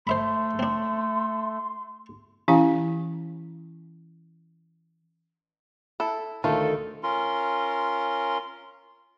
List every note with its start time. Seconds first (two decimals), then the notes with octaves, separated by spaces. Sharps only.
0.07 A3 C5 E5 B5 C6
0.59 C4 D4
2.48 E3 C#4 E4 G4 F5 G#5
6.00 E4 A4
6.44 D2 D#3 A3 F4 A4
7.03 C#4 F4 A#4 C6